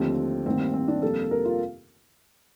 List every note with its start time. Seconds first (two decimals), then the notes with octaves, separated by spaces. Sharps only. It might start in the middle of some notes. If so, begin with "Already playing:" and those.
Already playing: D#2 D3 F3 A3 C4
0.46 A1 G2 D#3 A#3 C4
0.74 C4
0.88 D4
1.02 F2 C3 G3 A#3 A4
1.31 A#4
1.45 F4